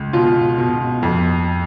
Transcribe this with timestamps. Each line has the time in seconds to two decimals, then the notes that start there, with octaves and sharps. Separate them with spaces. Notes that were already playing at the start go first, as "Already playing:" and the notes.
Already playing: C#2
0.13 B2 F4
0.58 B2
1.03 F2